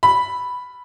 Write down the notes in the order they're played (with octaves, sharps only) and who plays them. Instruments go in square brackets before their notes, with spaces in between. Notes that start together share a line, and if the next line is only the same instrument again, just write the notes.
[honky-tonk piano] B5